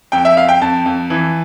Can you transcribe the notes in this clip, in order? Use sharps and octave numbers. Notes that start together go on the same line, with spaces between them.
F2 G5
E5
F2 F5
G5
F2 A5
F2
E3